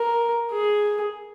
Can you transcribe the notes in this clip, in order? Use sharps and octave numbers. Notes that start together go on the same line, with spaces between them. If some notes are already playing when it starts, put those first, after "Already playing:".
Already playing: A#4
G#4